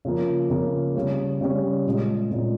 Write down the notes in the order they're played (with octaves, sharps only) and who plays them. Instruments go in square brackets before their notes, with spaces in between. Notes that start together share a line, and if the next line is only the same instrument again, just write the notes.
[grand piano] C#3 F3 A#3
C#3 F3 A#3
C#3 G3 C#4
C#3 G3 C#4
A#2 G#3 C#4
A#2 G#3 C#4